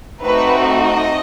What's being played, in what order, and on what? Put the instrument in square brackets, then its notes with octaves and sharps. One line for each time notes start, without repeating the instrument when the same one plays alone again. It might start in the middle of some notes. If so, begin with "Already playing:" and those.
[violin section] A3 C4 D#4 F#4 B4
D#5